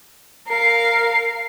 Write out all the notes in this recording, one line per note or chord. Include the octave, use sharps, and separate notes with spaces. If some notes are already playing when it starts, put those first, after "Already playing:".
A#4 F5 C7